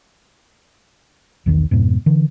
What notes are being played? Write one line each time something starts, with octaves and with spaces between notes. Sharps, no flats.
B1 E2 D#3
F2 G#2 B2
D3 E3